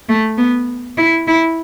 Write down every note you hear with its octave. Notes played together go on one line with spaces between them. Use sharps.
A3
B3
E4
E4